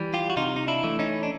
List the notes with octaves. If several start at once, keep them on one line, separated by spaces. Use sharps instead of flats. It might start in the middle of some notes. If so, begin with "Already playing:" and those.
Already playing: E3 G3
F4 G4
F#4
C3 D#4 F4
D#4
D4 E4
E3 A3
C#4 D#4
D4